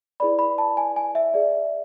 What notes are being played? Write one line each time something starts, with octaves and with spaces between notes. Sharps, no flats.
E4 G#4 B4 D5 B5
B5
A5
G#5
G#5
E5
G#4 D5